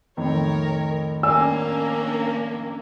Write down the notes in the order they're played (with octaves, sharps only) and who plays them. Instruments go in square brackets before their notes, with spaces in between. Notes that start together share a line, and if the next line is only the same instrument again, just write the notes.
[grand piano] F2 A2 D#3 [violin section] A#4 C#5
[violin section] A#3 C#4 D4 [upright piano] D5 G#5 E6